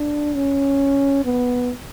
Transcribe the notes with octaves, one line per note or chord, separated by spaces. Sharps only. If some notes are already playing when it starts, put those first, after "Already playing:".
Already playing: D4
C#4
B3